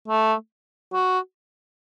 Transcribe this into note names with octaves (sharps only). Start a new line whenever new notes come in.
A3
F#4